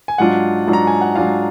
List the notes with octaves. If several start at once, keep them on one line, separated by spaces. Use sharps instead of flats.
G#5
G#2 F#3 D4 F4 F#5
G#2 F#3 D4 F4
A#5
G#5
F#5
G#2 F#3 D4 F4 F5